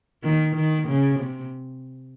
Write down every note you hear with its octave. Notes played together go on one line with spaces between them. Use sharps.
D#3
D#3
C#3
C3